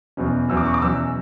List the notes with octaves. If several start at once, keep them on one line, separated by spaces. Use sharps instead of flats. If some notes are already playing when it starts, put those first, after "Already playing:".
E2 B2 F#3 C#4
E2 B2 F#3 C#4 E6
D6
C#6
D6
E2 B2 F#3 C#4 E6